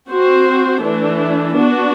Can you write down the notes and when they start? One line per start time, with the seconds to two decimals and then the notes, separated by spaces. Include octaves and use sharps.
0.10 C4 F#4 C5
0.83 E3 A3 D4
1.54 B3 D4 F#4